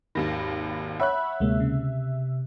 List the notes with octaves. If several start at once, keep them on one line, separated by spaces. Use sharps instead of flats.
G#1 D#2 D#3 B5 A#6
C#5 E5 F#5 B5 F#6
D2 C3 G#3 A#3
C#3